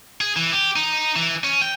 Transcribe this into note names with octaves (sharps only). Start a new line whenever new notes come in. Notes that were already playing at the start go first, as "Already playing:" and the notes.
G#4
E3
G4
D#4
E3
C#4
G5